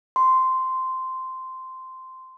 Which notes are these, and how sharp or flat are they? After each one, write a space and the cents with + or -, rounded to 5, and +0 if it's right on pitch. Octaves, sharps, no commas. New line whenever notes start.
C6 -10